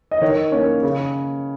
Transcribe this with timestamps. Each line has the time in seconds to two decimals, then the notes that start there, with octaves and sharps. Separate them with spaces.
0.11 D#5
0.21 D#3 C#5
0.52 A#3 C#4
0.83 C#3